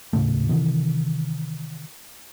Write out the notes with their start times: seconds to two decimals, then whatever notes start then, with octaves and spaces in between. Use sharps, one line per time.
0.13 D#1 A2 C#3 A3
0.49 C3 D#3 E3